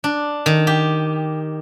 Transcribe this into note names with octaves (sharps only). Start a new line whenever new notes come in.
D4
D#3
G4